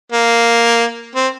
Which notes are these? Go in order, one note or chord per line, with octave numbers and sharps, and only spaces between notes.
A#3
C4